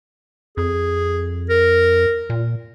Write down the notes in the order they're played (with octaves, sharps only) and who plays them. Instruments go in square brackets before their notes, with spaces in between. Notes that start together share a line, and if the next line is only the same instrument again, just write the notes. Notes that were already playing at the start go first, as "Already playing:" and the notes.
[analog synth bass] F2 [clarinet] G#4
[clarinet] A#4
[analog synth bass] A#2